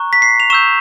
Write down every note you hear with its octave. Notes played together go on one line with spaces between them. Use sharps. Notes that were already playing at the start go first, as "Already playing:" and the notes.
Already playing: A#5 C#6 F#6
B6
C7
F7
C#6 E6 G6 E7